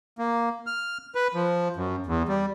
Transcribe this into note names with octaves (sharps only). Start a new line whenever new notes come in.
A#3
F6
B4
F3
F#2
E2
G3